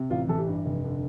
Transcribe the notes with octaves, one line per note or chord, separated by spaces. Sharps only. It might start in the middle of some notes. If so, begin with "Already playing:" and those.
Already playing: C3
A1 F4
E3 A4
G4
G2
F1
D3